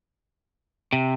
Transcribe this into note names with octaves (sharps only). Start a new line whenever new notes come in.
C3